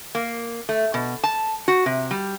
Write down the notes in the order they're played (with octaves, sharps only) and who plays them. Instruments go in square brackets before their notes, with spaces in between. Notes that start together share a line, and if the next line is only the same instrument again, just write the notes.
[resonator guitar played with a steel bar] A#3
A3
B2
A5
F#4
C3
G3